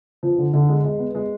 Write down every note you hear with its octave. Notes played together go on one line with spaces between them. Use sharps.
F3
D3
D3
G#3
G#3
B3
G#3